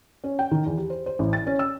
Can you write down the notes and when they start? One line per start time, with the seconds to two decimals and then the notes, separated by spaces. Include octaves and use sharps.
0.24 C#4
0.39 G5
0.51 D#3
0.66 E2
0.78 G4
0.90 C5
1.06 C5
1.19 A1
1.33 A6
1.47 C#4
1.59 E6